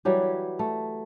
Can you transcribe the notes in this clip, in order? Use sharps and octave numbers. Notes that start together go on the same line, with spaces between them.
E3 F#3 G3 G4
A3